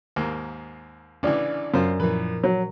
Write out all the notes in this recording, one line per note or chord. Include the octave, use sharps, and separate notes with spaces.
D#2 G#2 A#3
A1 C#3 E3 D4 D5
F#2 F4 C5
A#2 E3 F3 A#4 B4
F#3